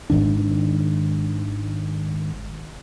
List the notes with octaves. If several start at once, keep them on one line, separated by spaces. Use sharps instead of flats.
G#1 G#2 D#3 D4